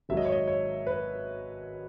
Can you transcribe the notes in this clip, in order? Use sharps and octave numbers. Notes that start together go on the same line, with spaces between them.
G#1 G#2 F#3 E5
D#5
C#5
D#5
C#5
B4